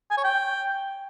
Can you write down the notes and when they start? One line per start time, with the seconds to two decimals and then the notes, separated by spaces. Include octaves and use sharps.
0.11 G#5
0.17 C#5
0.24 G5